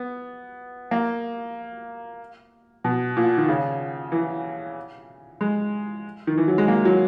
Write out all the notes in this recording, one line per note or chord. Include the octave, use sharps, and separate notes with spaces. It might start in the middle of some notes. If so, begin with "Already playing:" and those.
Already playing: B3
A#3
B2
A#2
D#3
C#3
E3
G#3
D#3
E3
F#3
G#3
A#3
F#3